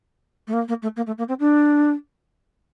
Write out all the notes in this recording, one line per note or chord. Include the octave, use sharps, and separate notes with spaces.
A3
A#3
A#3
A3
A#3
A3
A#3
C4
D4